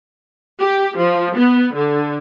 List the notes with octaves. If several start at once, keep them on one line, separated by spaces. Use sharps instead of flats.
G4
F3
B3
D3